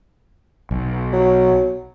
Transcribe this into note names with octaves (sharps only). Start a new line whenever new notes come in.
B1
F#3